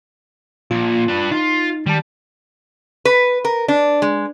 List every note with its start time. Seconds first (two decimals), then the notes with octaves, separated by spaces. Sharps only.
0.71 A#2 F3 F4
1.08 D4 B4
1.31 D#4 F4
1.86 D#3 G3 A5
3.05 B4
3.45 A#4
3.68 D4
4.02 G#3